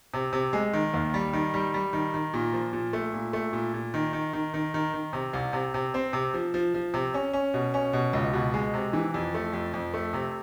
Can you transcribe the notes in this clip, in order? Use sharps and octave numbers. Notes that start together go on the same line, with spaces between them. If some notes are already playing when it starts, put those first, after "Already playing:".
C3
C3
G#3
D#3
D#2
G3
D#3
G3
G3
D#3
D#3
A#2
F3
A#2
A3
A#2
A3
A#2
A#2
D#3
D#3
D#3
D#3
D#3
D#3
C3
C2
C3
C3
C4
C3
F3
F3
F3
C3
C#4
C#4
B2
C#4
B2
C#2
B2
G#3
C3
E3
F2
A3
F2
F2
A3
C3